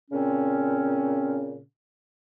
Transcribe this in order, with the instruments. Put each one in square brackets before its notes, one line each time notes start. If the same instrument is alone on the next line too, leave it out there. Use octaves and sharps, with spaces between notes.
[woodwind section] A#2 C#3 C4 C#4